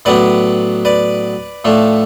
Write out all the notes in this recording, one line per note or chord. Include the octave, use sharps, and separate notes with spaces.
A2 F#3 B3 D4 B4 D5
B4 D5
A2 F3 A3 D4